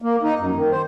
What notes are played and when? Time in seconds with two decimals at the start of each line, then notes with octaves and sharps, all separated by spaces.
0.02 A#3
0.23 D#4
0.40 F#2
0.55 D#3
0.71 C5